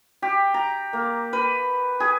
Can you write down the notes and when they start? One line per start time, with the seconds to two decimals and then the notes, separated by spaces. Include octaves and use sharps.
0.22 G4
0.54 A#5
0.93 A#3
1.33 B4
2.00 G#4